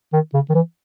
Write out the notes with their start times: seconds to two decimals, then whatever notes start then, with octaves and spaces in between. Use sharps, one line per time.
0.13 D#3
0.34 C#3
0.50 D#3
0.55 E3